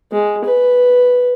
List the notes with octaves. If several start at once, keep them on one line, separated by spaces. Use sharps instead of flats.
G#3
B4